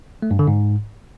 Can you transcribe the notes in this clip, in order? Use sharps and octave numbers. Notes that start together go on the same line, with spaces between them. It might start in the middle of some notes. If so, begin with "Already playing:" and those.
A3
G2
D3
G#2